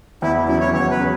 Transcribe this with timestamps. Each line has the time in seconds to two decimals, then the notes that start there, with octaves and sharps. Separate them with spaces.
0.22 E2 E4
0.48 C#3 F#3 E4
0.60 C#5
0.74 E2 C#5
0.91 B4
1.00 C#3